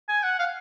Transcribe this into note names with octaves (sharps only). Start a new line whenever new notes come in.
G#5
F#5
F5